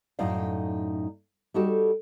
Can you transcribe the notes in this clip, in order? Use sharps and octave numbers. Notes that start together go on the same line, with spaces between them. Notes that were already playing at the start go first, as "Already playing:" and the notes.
F#2 A2 D#4 D5 F5
G3 D#4 F#4 G4 A4